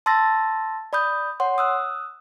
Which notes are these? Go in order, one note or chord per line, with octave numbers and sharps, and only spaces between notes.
A5 C6 E6 A6 A#6
D5 B5 D#6 G6
C#5 F#5 C6
D#6 E6 F#6